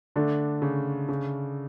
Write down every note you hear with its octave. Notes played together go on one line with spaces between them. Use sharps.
D3 A3 D4
C#3
C#3